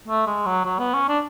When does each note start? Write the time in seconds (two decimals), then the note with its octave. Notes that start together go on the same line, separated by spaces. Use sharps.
0.08 A3
0.27 G#3
0.46 F#3
0.65 F#3
0.79 B3
0.94 C#4
1.09 D4